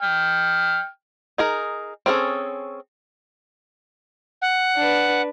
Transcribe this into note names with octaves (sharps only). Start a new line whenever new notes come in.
G5 F6
D#4 G#4 A#4
C4 C#4 G#4 A4
F#5
D4 B4